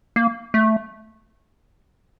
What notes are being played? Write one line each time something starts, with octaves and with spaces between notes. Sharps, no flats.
A#3
A3